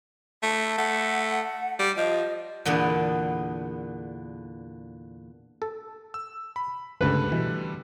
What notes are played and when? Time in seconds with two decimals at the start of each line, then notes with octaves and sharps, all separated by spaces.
0.43 A3
0.78 A3 F#5
1.79 G3
1.97 F3 D#5
2.65 E2 A#2 D3 B3
5.62 A4
6.14 E6
6.56 B5
7.01 G1 C#2 D3 G3 A3 B4 G5
7.32 B2 E3